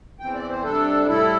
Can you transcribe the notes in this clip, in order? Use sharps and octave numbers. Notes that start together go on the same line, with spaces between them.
E2 E3 C4 G5
D5
C5
C3 G3 D4 A4
A2 G3 E4 A4